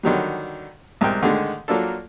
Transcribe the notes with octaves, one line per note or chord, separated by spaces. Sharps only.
D3 D#3 F#3 G3
C2 G#2 C4 A#4 G5
A2 D3 D#3 G#3
F#3 A#3 D4 F4 A4